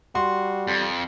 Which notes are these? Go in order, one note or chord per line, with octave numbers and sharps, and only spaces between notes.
G3 F#4 C6
F2